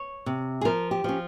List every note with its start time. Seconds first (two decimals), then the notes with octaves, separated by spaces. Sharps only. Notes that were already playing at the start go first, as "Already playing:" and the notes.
Already playing: C#5
0.26 C3
0.61 G#4
0.65 F3 A#4
0.91 G4
1.04 F3 C#4